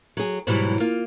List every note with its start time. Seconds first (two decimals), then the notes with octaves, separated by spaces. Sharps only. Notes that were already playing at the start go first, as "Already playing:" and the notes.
0.17 F#3 G#4
0.47 G#2 B2 E3 F#3 G3
0.80 A#3 F4